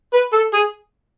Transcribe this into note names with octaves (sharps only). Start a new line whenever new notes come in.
B4
A4
G#4